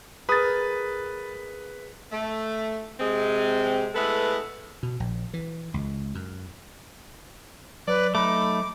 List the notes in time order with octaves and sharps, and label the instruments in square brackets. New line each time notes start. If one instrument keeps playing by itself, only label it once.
[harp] G#4 A#4 [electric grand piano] B4 D#6 [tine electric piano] B5 A6
[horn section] A3
C3 G#3 C4
G#3 A3 B3 E4 A4 B4
[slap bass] B2
A#1
E3
C#2
F#2
[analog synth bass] F#3 [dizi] B4 [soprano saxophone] D5
[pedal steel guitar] A3 D#4 [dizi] B5 [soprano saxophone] D6